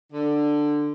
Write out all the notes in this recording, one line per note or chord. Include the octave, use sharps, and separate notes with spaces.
D3